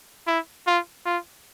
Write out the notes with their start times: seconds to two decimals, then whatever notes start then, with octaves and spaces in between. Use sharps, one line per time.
0.27 E4
0.67 F4
1.06 F4